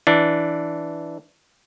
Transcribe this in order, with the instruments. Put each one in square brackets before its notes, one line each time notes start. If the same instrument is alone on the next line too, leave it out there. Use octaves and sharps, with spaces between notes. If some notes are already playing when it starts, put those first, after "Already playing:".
[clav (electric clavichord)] E3 D4